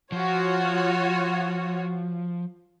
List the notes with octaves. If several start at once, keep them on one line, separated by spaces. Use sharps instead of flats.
F3 F4 F#4 C#5